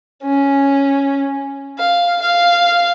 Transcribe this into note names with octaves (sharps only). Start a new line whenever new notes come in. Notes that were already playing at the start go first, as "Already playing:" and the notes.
C#4
F5
F5